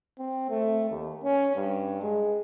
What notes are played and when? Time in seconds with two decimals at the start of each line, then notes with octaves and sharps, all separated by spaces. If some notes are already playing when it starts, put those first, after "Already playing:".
0.18 C4
0.50 A3
0.91 D#2
1.24 C#4
1.55 G2
2.02 G#3